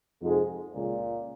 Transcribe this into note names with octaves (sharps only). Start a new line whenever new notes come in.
F2 G#2 C3 F3 G#3
C#2 A#2